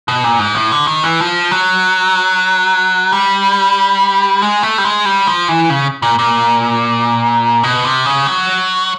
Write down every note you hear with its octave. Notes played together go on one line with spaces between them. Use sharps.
B2
A#2
G#2
A2
D3
D#3
E3
F3
F#3
G3
G#3
A3
G3
G#3
G3
F3
E3
C#3
A#2
A#2
B2
C3
C#3
F#3